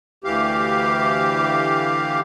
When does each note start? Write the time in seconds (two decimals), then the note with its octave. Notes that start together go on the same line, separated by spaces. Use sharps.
0.24 D2 E3 G4 F5